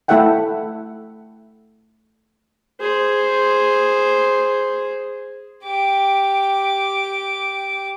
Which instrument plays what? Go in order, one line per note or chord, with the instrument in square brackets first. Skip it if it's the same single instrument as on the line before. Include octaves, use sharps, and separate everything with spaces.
[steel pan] A3 E4 A4 E5 F#5 G5
[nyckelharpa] G#4 C5
[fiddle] G4 D6